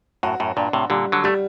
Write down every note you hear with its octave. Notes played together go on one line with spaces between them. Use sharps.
F#2 A2 F#4
F#2 A2
G2 A#2 D4
A2 C3
A#2 D3 G3
D3 F#3
G3 A3